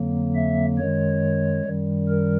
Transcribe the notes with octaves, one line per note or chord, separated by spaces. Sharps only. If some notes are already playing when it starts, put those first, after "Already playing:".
Already playing: F2 D3 F#3 A#3
E5
F#2 D#3 G#3 C#5
F#2 D#3 G3
A#4